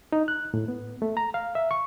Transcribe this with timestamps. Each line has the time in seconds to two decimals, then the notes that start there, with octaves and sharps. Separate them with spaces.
0.12 D#4
0.28 F#6
0.54 A2
0.68 B3
1.02 A3
1.17 A#5
1.34 F5
1.55 E5
1.71 C#6